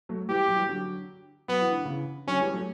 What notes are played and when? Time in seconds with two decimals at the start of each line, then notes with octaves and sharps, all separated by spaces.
0.09 F#3 A3
0.29 E3 G3 G4
0.48 F#3
0.55 E3 G3
0.69 D3 F#3
1.48 F#3 B3
1.61 E3
1.72 D3
1.85 C#3 E3
2.27 D3 F#3 C#4
2.41 E3 G3
2.54 F#3 A3